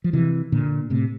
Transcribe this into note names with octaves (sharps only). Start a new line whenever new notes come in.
F3
C3 E3
A#2 D3
A2 C3